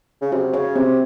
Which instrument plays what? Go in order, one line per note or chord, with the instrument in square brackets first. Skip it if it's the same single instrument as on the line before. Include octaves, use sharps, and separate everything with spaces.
[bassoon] C#3
[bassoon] C3 [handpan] F#4
[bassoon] C#3 [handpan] C#5
[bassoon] C3 [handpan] C4